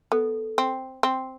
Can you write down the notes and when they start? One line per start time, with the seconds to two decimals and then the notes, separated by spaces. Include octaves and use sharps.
0.12 B3 A4
0.58 C4
1.03 C4